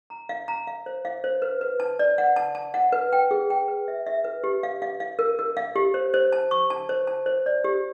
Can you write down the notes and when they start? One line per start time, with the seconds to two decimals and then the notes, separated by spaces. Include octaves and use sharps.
0.10 A#5
0.29 F5
0.48 A#5
0.67 F5
0.86 C5
1.05 F5
1.24 C5
1.42 B4
1.61 B4
1.80 A5
1.99 D5
2.18 F#5
2.36 A5
2.55 A5
2.74 F#5
2.92 B4
3.13 G5
3.31 G#4
3.50 G5
3.68 B4
3.88 E5
4.06 E5
4.24 B4
4.44 G4
4.63 F5
4.82 F5
5.00 F5
5.19 A#4
5.39 A#4
5.57 F5
5.76 G4
5.94 C5
6.14 C5
6.32 A5
6.51 C#6
6.70 A5
6.89 C5
7.07 A5
7.26 C5
7.46 D5
7.64 G4